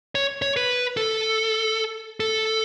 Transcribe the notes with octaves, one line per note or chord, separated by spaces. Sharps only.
C#5
C#5
B4
A4
A4